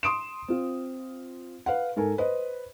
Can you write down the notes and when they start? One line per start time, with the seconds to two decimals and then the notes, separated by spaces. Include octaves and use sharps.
0.03 C6 D#6 D7 E7
0.48 C4 F4
1.66 B4 F5 F#5
1.96 G#2 A4 A#4 G#5
2.18 B4 C5 D#5